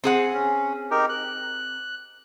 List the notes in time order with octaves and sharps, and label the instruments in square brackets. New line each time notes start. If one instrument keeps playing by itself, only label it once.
[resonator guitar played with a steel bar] C4 G#4 F#5
[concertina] C#4
D#4 G4 A#4
F#6